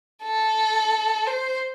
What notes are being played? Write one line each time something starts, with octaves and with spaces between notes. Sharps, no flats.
A4
C5